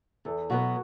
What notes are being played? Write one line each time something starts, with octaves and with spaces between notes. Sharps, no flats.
E2 A4
B2 F#3 B3 F#4